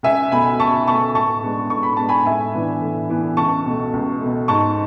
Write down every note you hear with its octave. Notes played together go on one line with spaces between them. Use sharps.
C#2 E5 G#5
B2 A3 G#5 B5
C#2 A5 C#6
B2 A3 A5 C#6
A2 A5 C#6
G#3 B3 D4
A2 C#6
B5
G#3 B3 D4 A5
G#5 B5
A2 E5 G#5
E3 B3 D4
A2
E3 B3 D4
C#2 A5 C#6
B2 A3
C#2
B2 A3
G#2 A5 C#6